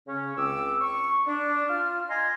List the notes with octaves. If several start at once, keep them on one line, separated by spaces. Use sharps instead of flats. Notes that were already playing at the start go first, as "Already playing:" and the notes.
C#3 C#4
C#2 C4 D6 E6
C#6
D4
F4 F6
D#5 G#5 A#5 C6